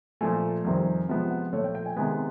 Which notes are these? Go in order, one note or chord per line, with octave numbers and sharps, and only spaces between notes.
A#2 F3 A3 G#5
F2 C3 D#3 G3 C4
C3 F3 G#3 B3 G5
F#5
A#2 F3 A3 C#5
G5
G5
G#5
C3 D#3 G#3 B3 G#5